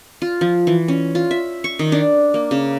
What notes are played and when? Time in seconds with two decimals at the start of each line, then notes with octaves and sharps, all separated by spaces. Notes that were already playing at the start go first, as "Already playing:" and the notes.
0.22 F4
0.41 F3
0.67 E3
0.88 C#4
1.15 F4
1.31 E5
1.64 C#6
1.79 D#3
1.92 D4
2.34 A#3
2.51 C#3